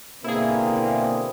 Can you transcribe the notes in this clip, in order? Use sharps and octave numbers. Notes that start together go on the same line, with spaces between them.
B2 D3 A#3 C4 E4 G#4